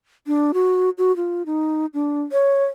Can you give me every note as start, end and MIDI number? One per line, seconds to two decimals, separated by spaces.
0.27 0.52 62
0.54 0.90 66
0.98 1.15 66
1.16 1.43 65
1.46 1.86 63
1.94 2.22 62
2.32 2.65 73